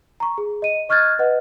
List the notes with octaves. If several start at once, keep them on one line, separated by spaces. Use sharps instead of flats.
A#5 C#6
G#4
D#5 D#7
D#5 C#6 F6 F#6 G#6 A6
B4 D#5 F#5